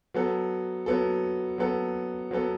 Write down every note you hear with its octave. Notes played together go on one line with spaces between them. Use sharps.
F#3 B3 A4
F#3 B3 A4
F#3 B3 A4
F#3 B3 A4